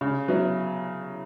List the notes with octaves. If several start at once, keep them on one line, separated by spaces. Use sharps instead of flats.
C#3
F#3 B3 E4